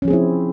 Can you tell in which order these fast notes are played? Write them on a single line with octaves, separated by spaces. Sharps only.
C#4 F3 G#4 C4 E4